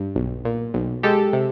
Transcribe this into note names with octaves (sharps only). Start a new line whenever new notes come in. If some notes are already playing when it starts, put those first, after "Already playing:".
Already playing: G2
B1
A#2
B1
G#3 G4 A4
C3